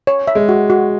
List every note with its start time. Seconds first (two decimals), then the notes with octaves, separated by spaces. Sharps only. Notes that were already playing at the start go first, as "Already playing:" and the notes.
0.07 C#5
0.28 E5
0.35 G#3
0.49 F#4
0.70 F#4